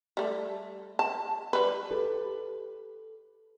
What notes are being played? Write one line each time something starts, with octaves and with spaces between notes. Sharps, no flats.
G3 A3
A5
G3 B4
G4 A4 B4